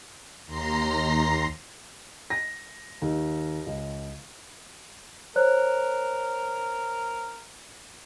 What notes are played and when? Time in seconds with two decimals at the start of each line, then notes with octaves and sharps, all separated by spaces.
0.46 D#2 A#5 C6 A#6 C7
2.30 A#6
3.02 D#2
3.66 C#2
5.36 A#4 C5 C#5 F#6